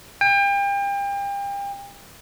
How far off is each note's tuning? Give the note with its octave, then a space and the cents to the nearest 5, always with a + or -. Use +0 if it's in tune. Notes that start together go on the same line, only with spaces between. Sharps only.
G5 +35